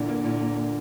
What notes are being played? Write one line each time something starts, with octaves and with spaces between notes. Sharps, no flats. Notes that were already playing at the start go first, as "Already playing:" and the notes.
Already playing: A#2 D3 E3
A#3
A#2
A#2
A#2